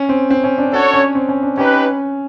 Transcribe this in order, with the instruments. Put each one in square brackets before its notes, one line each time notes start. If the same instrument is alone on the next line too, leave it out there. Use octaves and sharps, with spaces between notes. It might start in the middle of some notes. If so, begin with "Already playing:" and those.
Already playing: [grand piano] C#4
C4
C4
C#4
D4
[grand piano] D4 [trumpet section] F#4 A4 C#5
[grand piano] C#4
C4
C#4
D4
[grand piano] C#4 [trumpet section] D#4 G4 B4